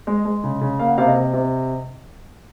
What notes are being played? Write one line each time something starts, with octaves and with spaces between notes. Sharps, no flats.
G#3 D#5
G#3
C#3
C#3
A#3 F5
F#5
C3 F5
D#5
C3
C3